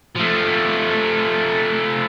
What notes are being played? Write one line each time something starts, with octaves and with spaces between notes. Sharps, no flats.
F3 A3